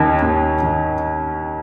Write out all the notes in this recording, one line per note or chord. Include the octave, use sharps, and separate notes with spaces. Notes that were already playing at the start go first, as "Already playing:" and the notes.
Already playing: D#2 D#3 C#4
D#2
D#3